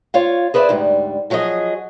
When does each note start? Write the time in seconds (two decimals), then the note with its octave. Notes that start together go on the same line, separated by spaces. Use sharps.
0.14 F4 C#5 F5
0.54 G#4 B4 C5 D5 E5
0.69 D2 G#2 G3
1.30 F3 F#3 G#4 B4 D#5